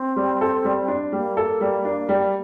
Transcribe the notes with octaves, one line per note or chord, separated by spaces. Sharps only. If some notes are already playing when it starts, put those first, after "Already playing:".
Already playing: C4
G3
A4
G3
D4
G3 A#3
A4
G3
D4
G3